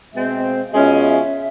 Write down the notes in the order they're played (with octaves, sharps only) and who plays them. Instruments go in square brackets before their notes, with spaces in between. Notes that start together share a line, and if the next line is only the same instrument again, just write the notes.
[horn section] B2 G#3 C4 [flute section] E5
[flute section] F5
F5
[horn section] B2 G#3 C#4 F4 [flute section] E5
[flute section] E5